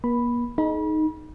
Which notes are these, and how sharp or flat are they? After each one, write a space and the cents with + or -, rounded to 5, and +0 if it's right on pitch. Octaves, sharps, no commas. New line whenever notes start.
A#3 +45 B5 +0
D#4 +0 G#4 +40 B5 -35